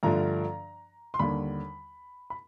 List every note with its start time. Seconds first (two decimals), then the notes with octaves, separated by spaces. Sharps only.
0.03 G2 D3 F3 A3 D4 A#5
1.14 C6
1.19 D#2 D3 G3 B5
2.30 B5